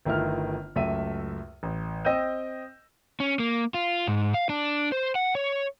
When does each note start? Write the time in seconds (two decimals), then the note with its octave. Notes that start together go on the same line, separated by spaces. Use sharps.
0.05 G1 D#3 A3 E4 F4 F6
0.76 C#2 F#2 A3 E5 D#7
1.63 A1
2.05 C4 D#5 G5 E6 G6 D#7
3.20 C#4
3.39 A#3
3.74 F4
4.08 G#2
4.34 F5
4.49 D4
4.92 C5
5.15 F#5
5.35 C#5